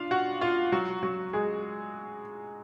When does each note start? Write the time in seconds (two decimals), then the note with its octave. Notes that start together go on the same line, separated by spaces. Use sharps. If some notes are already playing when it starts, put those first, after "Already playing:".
Already playing: D4 F4 F5
0.11 F#4 F#5
0.41 F4 F5
0.72 F#3 F#4
1.03 F#3 F#4
1.33 G#3 G#4